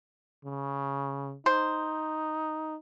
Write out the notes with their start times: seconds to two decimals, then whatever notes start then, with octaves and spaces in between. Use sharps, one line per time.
0.44 C#3
1.46 D#4 C5